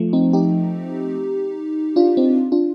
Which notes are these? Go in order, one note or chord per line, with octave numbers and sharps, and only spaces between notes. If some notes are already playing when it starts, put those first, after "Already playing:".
Already playing: F3 A3
C4 D#4
D#4 G4
D4 F4
C4 D#4
D4 F4